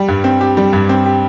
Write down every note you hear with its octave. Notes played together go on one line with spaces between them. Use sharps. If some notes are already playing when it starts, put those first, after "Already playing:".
Already playing: G3
G2
C4
G4
G3
G2
C4
G4